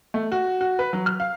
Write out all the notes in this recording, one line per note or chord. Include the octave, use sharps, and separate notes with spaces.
A3
F#4
F#4
B4
F#3
F6
F5